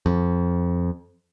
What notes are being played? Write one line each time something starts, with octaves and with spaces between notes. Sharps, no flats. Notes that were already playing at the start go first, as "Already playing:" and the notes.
F2